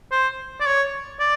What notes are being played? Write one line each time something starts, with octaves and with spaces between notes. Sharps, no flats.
C5
D5
C#5
D5